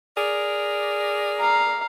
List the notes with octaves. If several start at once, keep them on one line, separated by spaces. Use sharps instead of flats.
G#4 A#4 D5
F5 A#5